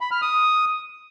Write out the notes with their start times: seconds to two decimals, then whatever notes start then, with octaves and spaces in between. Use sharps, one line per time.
0.01 B5
0.11 F6
0.22 D#6